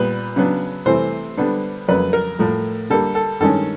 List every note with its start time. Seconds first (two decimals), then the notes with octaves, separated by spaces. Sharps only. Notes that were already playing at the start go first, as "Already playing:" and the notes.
Already playing: A#2 G3 B3 B4
0.36 C#3 F#3 B3 D4
0.86 C3 E3 A3 C5
1.37 D3 G3 B3 D4
1.88 F2 C#3 F#3 A#3 B4
2.13 A#4
2.39 A2 F3 A3
2.90 D3 G3 A#3 A4
3.15 A4
3.40 G2 D#3 G#3 C#4 A4